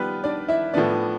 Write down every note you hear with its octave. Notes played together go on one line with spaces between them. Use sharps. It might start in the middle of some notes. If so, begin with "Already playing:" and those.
Already playing: F3 G3 B3 F4 G4 B4
D4 D5
E4 E5
A2 F3 B3 D4 D5